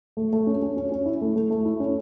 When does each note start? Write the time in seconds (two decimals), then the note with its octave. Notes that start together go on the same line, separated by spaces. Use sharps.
0.17 A3
0.33 A3
0.47 C#4
0.62 C#4
0.77 C#4
0.92 C#4
1.06 E4
1.21 A3
1.36 A3
1.51 A3
1.65 E4
1.80 C#4